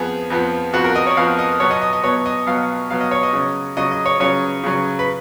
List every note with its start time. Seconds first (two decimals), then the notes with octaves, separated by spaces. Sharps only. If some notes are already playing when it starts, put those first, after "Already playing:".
Already playing: F2 F3 B3 G#4
0.30 F2 F3 B3
0.73 F2 F3 B3 F#4
0.84 A#4
0.95 D#5
1.06 C#5
1.17 F2 F3 B3 F5
1.39 D#5
1.60 B2 F#3 B3 C#5
1.71 D#5
1.82 D#5
1.93 D#5
2.03 B2 F#3 B3 C#5
2.26 D#5
2.46 B2 F#3 B3 F5
2.90 B2 F#3 B3 F5
3.01 D#5
3.11 C#5
3.23 D#5
3.33 C#3 F#3 C#4
3.77 C#3 F#3 C#4 D#5
3.91 D#5
4.06 C#5
4.20 C#3 F#3 C#4 C#5
4.64 C#3 F#3 C#4
4.99 B4